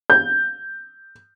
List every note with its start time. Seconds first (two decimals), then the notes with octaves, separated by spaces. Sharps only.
0.10 G6